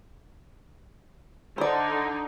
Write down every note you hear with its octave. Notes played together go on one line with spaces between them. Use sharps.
D3 D#4 C5 D5